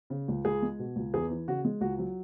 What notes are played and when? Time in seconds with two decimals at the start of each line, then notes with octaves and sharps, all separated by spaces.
0.10 C#3
0.28 C#2
0.45 C#2 G#4
0.62 G#3
0.79 B2
0.96 C#2
1.14 E2 G#4
1.31 E3
1.48 C#3 F#4
1.65 G#3
1.81 C#2 F#4
1.98 F#3